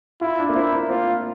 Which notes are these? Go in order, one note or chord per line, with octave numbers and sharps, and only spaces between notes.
E4 F4
D4
A#3
C4 E4
A#3
C4 F4